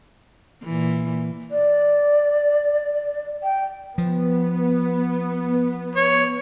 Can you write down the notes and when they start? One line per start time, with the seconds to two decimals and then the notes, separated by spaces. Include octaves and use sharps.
0.64 A#2 E3
1.51 D5
3.43 G5
3.98 F3 B3
5.96 C#5